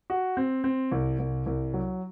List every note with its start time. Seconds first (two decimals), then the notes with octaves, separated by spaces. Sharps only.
0.10 F#4
0.37 C4
0.64 C4
0.91 C2
1.19 C2
1.46 C2
1.74 F#3